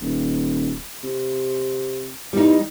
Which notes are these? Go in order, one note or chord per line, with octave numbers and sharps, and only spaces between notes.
D#1
C3
E2 G3 D#4